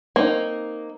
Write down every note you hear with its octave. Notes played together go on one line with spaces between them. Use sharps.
A#3 C4 D#4